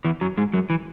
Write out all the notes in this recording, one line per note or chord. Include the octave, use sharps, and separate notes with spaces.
E2 E3
F#2 F#3
G#2 G#3
F#2 F#3
E3